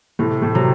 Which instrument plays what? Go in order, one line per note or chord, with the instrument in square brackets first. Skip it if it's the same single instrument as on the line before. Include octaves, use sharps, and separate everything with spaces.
[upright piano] A2 A3 [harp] C3
[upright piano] A2 A3
[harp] C3 [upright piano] F#3